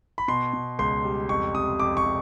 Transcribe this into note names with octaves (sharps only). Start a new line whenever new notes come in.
B5
B2 C6
B2
C#2 C6
G3
F2 C#6
C3 D#6
F2 D6
C#6
C3